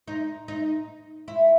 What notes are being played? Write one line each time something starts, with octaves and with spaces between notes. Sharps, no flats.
D#4
D#4
E4